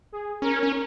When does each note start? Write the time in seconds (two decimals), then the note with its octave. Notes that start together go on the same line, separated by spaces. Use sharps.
0.12 G#4
0.42 C#4 A#4
0.63 C#4